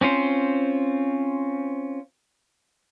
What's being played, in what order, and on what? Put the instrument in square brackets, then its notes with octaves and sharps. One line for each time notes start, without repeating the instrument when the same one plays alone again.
[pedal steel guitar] C4 C#4 F4 C5